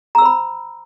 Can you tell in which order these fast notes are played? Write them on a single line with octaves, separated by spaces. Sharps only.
A#5 E6 C5 B5